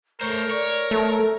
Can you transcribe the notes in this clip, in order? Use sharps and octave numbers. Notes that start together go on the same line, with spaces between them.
A3 A#4 C5 C#5
C#5 D5
A3 A4